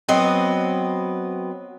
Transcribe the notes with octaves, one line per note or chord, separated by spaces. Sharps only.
F#3 B3 C4 D#5